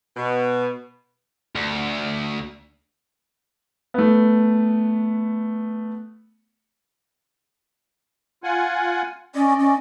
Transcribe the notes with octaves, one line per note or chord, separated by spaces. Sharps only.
B2
D2
A3 B3
F4 F#5 G#5
C#4 D5 D#5
C#4